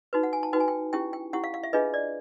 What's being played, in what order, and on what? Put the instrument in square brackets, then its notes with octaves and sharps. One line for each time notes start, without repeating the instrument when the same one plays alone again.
[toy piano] D#4 F#4 B4
F#5
G#5
A5
D#4 F#4 B4 G5
G#5
G5
C#4 E4 G4 G5
G5
C#4 E4 G4 F#5
F5
F5
E5
D4 F4 G#4 B4 D#5
D5